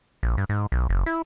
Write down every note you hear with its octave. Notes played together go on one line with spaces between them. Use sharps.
A#1
G2
G#2
B1
F#1
E4